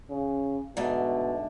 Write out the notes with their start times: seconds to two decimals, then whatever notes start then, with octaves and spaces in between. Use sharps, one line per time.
0.10 C#3
0.77 G#2 B2 D3 A3